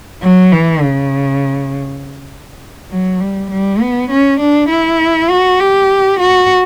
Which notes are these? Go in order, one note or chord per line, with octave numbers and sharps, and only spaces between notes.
F#3
E3
C#3
F#3
G3
G3
B3
C#4
D4
E4
F#4
G4
F#4